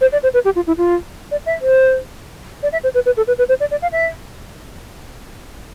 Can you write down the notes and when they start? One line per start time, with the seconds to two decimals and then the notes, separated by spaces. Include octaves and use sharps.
0.01 C5
0.12 D5
0.23 C5
0.34 B4
0.45 G4
0.56 F4
0.67 E4
0.78 F4
1.31 D5
1.46 E5
1.61 C5
2.63 D5
2.73 E5
2.83 C5
2.94 B4
3.06 B4
3.17 A4
3.27 B4
3.38 B4
3.49 C5
3.60 D5
3.71 D5
3.82 F5
3.92 E5